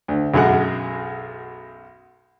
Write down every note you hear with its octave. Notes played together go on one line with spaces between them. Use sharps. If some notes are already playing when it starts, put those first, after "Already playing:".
D2
B1 F#2 G#3 F#5